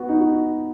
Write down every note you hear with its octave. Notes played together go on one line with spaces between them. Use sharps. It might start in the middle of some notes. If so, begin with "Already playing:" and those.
Already playing: B3 F#4
D#4
F#4